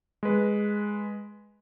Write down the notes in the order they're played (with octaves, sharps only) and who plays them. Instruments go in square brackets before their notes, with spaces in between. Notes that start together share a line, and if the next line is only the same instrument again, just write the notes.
[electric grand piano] G#3 B4